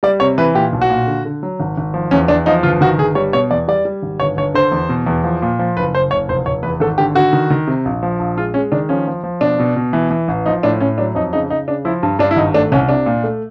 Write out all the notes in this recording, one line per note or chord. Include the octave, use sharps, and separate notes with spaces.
G3 D5
C3 C#5
E3 B4
A#2 G4
B1
F#4
A#2
D3
D3
F#3
G#1
G#1
F3
E2 C#4
E2 D4
F3 D#4
G1 F4
D#3 F#4
G1 G#4
G3 C#5
B2 C#5
E2 D5
G3 D5
G3
G#1
G1 C#5
G1 C#5
D3 C5
E2
B2
E2
F3
A#2
F3
F#1 B4
F#1 C5
F#1 C#5
F1 C5
F1 C#5
E2 B4
G#1 A4
D3 G4
D3 F#4
D#3
D#3
C3
A#1
F3
A#1
G#3 F4
G#3 C#4
D#3 D4
F3 C#4
F3
F3
B2 D4
B2
B2
E3
E3
A1
F3 D#4
A2 D4
A2 C#4
F#3 D4
F2 D#4
C#3 D#4
C#3 D#4
C#3 D4
F3 E4
G2
G2 D4
E4
G#1 D#4
A3 D4
C2 C#4
C3 D4
A#2
A3